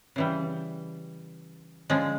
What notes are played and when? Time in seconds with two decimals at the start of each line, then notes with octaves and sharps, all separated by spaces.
0.16 C#3 E3 G3
1.90 D3 F3 G#3 C#4